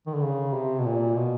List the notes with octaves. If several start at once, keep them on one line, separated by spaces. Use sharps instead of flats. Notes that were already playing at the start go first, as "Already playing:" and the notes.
D#3
D3
C#3
C3
B2
A#2
B2